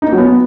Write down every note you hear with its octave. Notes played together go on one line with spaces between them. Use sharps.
D#4
A#3
F#3
B3